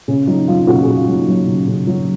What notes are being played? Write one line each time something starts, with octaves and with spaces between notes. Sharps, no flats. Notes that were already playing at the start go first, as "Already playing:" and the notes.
C#3 C#4
F#3 D#4
F#3 F4
C#3 F#4
G#4
C#3
F4
F#3
D#4
F#3
C#3
C#3
F#3